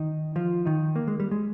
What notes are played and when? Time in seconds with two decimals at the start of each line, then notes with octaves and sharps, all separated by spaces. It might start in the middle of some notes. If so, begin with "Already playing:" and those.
Already playing: D#3 D#4
0.36 F3 F4
0.65 D#3 D#4
0.96 A#3
1.07 G#3
1.20 G3
1.31 G#3